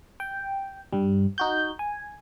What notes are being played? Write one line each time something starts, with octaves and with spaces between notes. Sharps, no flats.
G5
G2 G3
D#4 F#4 G6
G#5